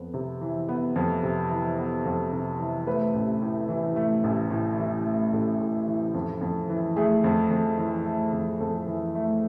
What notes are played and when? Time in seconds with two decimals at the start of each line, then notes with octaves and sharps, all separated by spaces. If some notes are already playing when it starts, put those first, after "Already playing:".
Already playing: F2 B3
0.14 C3
0.41 E3
0.69 B3
0.96 F2
1.23 C3
1.51 E3
1.78 B3
2.05 F2
2.33 C3
2.60 E3
2.87 A3 B4
3.14 A1
3.41 A2
3.69 E3
3.96 A3
4.24 A1
4.50 A2
4.78 E3
5.05 A3
5.33 A1 A4
5.60 A2
5.87 E3
6.14 F2
6.41 F2
6.69 E3
6.96 A3 G#4
7.24 F2
7.51 F2
7.78 E3
8.05 A3
8.33 F2
8.60 F2 A4
8.87 E3
9.15 A3